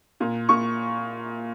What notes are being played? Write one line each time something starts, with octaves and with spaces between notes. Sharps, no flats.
A#2
A#2 C#6